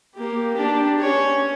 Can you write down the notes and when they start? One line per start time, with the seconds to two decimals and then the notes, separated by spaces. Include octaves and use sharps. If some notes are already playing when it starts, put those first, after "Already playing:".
0.15 A#3 G4
0.54 D4 G4
0.98 C#4 C#5